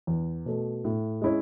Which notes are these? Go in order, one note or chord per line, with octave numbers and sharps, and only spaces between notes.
E2
B2 A3
A2
G#3 C#4 E4